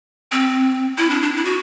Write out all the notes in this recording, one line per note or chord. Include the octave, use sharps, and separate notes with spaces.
C4
E4
D4
D4
E4
F#4